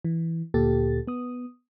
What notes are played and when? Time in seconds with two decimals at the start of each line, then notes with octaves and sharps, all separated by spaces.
0.05 E3
0.54 D2 A#2 G4 A4 A6
1.07 B3 D#6